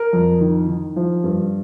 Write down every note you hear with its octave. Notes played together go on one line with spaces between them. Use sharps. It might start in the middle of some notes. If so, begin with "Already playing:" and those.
Already playing: A#4
F2
D#3
D#3
F3
G2